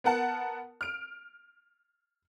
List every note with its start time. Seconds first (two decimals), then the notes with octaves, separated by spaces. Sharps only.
0.04 B3 A#4 F#5 A5
0.81 F6 D7